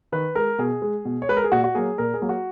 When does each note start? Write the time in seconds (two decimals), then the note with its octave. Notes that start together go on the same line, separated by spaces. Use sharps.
0.12 D#3 B4
0.35 G#3 A#4
0.59 B2 G#4
0.82 G#3
1.05 B2
1.22 C#5
1.29 G#3 B4
1.37 A#4
1.44 G#4
1.52 A#2 F#4
1.64 F#4
1.75 F#3 A#3 G#4
1.98 A#2 A#4
2.14 G#4
2.22 F#3 A#3
2.29 F#4